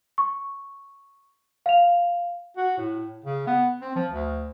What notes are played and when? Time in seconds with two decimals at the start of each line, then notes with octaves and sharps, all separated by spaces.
0.18 C#6
1.66 F5 F7
2.57 F#4
2.77 A2
3.24 C#3
3.47 B3
3.81 C4
3.95 F3
4.11 D2